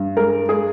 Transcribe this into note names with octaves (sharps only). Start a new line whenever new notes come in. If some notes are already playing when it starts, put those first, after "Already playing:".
Already playing: G2
G#3 A#4
G#3 G#4